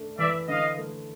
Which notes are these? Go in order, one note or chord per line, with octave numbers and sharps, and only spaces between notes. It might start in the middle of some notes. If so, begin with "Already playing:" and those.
Already playing: A3 D4
E3 D5 E5
D3 D#5 F5
A3